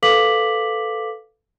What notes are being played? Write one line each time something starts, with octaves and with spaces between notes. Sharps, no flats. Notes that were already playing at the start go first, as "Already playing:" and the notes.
A4 B4 F5 D6 B6 F#7